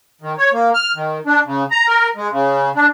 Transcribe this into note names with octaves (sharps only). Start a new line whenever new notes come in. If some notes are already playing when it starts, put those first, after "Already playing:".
D#3
C#5
A#3
F6
D#3
D4
C#3
A#5
A#4
G#3
C#3
D4